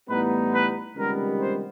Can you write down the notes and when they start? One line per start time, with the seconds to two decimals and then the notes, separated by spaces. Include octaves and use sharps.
0.08 A2 E3 G3 B3 D#4 B4
0.52 B4
0.96 C#2 C3 D#3 G3 B3 A#4
1.40 C5